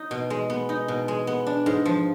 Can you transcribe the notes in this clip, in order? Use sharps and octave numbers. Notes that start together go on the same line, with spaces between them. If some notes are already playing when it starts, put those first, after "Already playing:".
Already playing: D#4
B2
G#3
B3
D#4
B2
G#3
B3
D4
G#2
F3